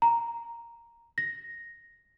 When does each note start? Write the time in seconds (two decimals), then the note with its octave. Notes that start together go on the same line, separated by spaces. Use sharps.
0.02 A#5
1.18 A#6